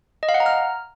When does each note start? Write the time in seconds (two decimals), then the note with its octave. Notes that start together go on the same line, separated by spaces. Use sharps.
0.23 D#5
0.29 F5
0.34 F#5
0.40 A#5
0.46 F6